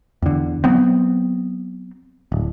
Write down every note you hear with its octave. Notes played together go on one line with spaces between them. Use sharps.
E2 D3
F#3 B3 C4
D1